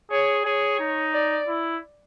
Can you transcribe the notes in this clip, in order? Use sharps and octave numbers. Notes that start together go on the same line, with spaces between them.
G#4 C#5
G#4 C#5
D#4
D5
E4